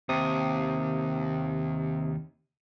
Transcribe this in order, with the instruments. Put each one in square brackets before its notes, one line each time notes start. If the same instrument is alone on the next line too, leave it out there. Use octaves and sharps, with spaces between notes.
[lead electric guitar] D#2 [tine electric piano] C3 D#6